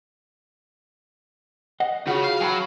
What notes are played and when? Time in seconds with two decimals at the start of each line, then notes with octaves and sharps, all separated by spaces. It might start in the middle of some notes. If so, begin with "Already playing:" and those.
1.80 D#5 F#5
2.07 C#3 F4 F#4 G#4
2.24 F5
2.40 F#3 G5 A5 B5